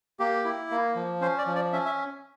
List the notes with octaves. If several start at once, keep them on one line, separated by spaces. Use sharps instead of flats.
A#3 G4
E4
A#3
F3
C#4 C5
D5
F3
D5
C#4 E5
E5